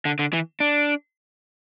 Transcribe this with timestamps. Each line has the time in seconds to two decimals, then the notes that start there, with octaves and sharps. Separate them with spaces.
0.05 D3
0.19 D3
0.33 E3
0.60 D4